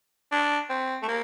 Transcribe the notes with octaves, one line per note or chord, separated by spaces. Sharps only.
D4
C4
A3
A#3